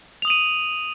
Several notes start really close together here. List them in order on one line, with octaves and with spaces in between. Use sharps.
F7 D#6 F#7 D#7